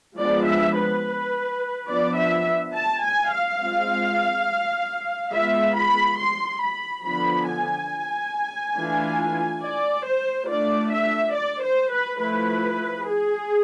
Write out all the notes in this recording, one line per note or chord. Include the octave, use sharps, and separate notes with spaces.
F3 G#3 B3 D4 F4 D5
E5
B4
F3 B3 D4 D5
E5
A5
G#5
F5
G#3 C4 F4
G#3 B3 F4 E5
B5
C6
B5
D3 F3 B3 B5
G#5
E3 A3 D4 F4
D5
C5
A3 D4 F4 D5
E5
D5
C5
B4
F3 A3 E4 B4
G#4